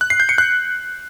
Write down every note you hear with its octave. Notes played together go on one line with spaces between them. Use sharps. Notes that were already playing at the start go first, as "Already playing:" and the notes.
F#6
C7
G6
C#7
F#6